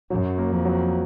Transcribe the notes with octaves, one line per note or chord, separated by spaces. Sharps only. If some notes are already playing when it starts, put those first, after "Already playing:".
F#2 F#3
A#3
F2
F#3